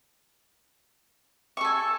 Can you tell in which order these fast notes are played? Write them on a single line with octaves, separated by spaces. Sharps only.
C#6 A4 G#5